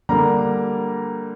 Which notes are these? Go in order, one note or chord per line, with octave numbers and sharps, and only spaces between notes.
D3 G3 A#3 A#5